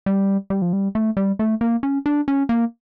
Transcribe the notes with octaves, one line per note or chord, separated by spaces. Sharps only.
G3
G3
F3
G3
A3
G3
A3
A#3
C#4
D4
C#4
A#3